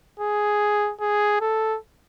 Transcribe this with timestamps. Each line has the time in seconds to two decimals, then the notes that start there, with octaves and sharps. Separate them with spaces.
0.19 G#4
1.01 G#4
1.41 A4